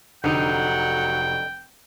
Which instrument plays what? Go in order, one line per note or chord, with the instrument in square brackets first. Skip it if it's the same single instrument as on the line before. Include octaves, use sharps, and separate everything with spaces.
[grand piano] F1 [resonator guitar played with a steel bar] D3 D#4 [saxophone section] F#3 F#5 [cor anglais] G5